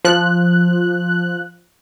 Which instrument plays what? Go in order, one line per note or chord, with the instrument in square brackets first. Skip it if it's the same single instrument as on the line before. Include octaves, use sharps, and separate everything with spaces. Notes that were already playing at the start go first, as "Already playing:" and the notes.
[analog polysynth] F3 F#6